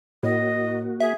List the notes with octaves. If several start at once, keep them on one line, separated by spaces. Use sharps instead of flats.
A2 A#3 F#4 D#5
G#4 E5